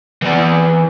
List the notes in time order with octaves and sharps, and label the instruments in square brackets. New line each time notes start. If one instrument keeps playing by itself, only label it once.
[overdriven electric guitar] E3 D5